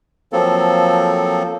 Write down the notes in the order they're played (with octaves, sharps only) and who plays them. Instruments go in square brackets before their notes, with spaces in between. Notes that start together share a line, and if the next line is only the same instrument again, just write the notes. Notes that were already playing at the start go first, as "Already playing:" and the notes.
[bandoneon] F3 F#3 A#3 C4 A4